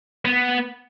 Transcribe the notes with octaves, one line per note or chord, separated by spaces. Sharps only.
B3